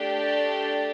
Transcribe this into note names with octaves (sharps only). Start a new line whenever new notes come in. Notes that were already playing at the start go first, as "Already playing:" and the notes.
Already playing: A3 D4 G4
D5